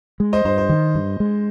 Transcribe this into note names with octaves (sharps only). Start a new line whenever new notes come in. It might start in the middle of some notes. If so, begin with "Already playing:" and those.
G#3
C5 D#5
G2 C5
C5
D#3
G2
G#3